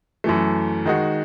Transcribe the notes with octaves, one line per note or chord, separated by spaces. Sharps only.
F#2 E3 A3
D#3 G#3 D#4 F#4